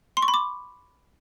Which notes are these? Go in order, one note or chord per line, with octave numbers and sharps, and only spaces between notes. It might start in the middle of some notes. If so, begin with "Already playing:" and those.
C6
C#6
B5
D6